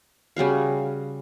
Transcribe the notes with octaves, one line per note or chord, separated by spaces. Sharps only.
C#3 G3 F#4 F5